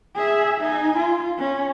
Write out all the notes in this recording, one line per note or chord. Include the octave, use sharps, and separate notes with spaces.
G#4 E5
D#4 G#5
F4
C#4